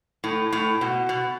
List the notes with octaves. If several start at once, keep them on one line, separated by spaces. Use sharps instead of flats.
A2
A2
B2
B2